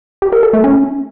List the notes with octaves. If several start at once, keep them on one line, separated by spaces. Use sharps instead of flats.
G4
A#4
A4
A3
C#4